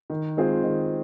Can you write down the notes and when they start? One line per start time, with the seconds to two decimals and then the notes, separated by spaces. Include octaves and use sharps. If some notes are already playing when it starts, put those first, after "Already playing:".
0.10 D#3
0.37 G#3 C4 F4 G#4
0.63 D#3